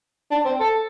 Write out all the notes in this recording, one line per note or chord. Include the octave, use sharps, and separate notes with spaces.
D4
C4
A4